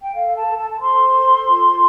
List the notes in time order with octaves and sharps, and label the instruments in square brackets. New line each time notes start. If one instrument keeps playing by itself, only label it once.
[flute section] G5
A4 F5
A5
A4
A5
A5
C5 C6
A4
F4